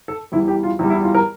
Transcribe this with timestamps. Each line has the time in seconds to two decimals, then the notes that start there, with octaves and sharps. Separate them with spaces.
0.08 A4
0.32 E2 E3 G3 E4
0.48 G4
0.63 F4
0.79 E2 E3 G3 E4
0.90 E4
1.03 F4
1.15 A#4